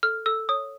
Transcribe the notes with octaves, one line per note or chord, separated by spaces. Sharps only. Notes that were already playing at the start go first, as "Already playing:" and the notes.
A4 F6
A4 E6
C#5 D#6